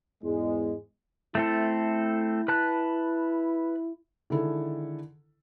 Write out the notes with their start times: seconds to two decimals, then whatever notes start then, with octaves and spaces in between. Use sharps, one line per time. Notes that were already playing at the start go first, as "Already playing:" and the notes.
0.23 E2 G#2 G#3
1.35 A3 C4 E4 A4
2.48 B4 A5 F#6
4.30 D3 D#3 G#3 E4 A4